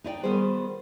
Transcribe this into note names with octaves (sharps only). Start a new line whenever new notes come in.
D#4 E4 D5 G5
D#3 G3 B3 F#4 G#4 C5